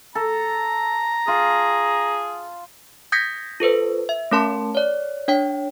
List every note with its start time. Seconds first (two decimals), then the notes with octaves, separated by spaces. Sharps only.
0.15 A4 A#5
1.28 F4 G#4
3.12 D#6 G6 G#6 A#6 B6 C#7
3.60 F4 A4 B4 C5
4.09 E5
4.31 A3 C#4 A#4 A5 C6
4.75 C#5 D5
5.28 D4 C#5 G5